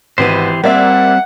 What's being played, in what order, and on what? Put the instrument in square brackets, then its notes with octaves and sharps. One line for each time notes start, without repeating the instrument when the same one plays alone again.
[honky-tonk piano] G#1 B3 D#7 [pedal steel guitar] E3 G4 C5
[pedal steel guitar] G3 C4 [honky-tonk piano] A#3 D5 E5 [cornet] F#5